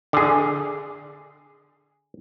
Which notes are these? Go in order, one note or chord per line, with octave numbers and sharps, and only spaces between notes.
D3 G#4